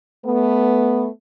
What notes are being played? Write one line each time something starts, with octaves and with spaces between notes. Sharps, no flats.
A3 B3